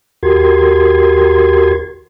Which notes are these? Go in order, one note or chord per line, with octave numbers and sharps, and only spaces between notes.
D#2 F#4 G4 A#4 C6 G#6